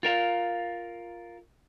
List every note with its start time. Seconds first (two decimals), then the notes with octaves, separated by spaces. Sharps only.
0.03 F4 A#4 F5